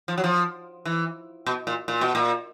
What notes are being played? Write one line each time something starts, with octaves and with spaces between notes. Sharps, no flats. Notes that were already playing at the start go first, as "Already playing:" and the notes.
F3
F#3
F3
E3
B2
A#2
A#2
B2
A#2